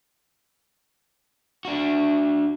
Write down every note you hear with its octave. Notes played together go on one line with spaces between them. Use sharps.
D4 F#4